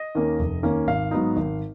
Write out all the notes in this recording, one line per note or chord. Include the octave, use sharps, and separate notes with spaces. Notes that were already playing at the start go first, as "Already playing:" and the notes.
Already playing: D#5
D#2 D#3 A#3 C#4
F1
D#2 D#3 A#3 C#4
G#1 F5
G#2 F#3 B3 D#4
G#1